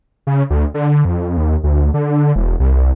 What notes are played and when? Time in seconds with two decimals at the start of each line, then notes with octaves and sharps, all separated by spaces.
0.27 C#3
0.50 D2
0.74 D3
1.05 F2
1.37 D#2
1.63 D2
1.94 D3
2.36 E1
2.60 C2